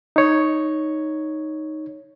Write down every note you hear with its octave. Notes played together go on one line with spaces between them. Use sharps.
D#4 C#5